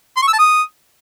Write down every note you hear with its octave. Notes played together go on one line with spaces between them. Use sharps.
C6
C#6
E6
A5
D#6